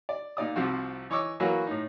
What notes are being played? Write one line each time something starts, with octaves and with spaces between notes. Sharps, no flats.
D5
A#2 D#4 D5 D#6
C2 C3 F3 C4 F#4
E3 C#5 D#5 C#6 D6 E6
E3 F#3 A#3 F#4 B4
A2 D#4